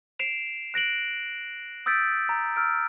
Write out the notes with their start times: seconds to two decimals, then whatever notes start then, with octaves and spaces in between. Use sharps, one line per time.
0.19 C7 D7 E7 F7
0.74 F#6 A#6 D7 F#7
1.86 D#6 E6 G6 A6 B6 D7
2.29 A#5
2.56 E6 F6 D7